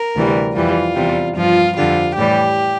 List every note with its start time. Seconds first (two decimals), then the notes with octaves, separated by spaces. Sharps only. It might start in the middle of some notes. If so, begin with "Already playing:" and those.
Already playing: A#4
0.15 D2 C3 E3 G3
0.55 F2 E3 G3 F4
0.95 E2 C3 G3
1.36 G2 F3 F4
1.76 F2 D3 G3 F4
2.16 A2 E3 G3 G4